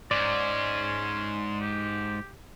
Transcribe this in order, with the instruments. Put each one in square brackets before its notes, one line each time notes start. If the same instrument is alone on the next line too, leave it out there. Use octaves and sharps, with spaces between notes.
[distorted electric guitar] G#2 [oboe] C#4 [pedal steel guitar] D5 [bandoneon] C6
[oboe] G4